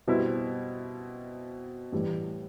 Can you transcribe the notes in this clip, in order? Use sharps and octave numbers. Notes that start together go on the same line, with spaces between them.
B2 G3 C4 E4
A2 E3 G3